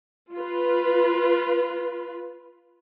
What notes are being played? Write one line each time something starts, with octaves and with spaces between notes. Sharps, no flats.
F4 B4